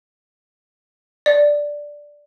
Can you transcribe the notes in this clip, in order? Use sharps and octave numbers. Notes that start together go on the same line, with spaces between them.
D5